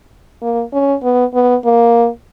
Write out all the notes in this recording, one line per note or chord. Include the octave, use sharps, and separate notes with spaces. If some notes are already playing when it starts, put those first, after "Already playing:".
A#3
C#4
B3
B3
A#3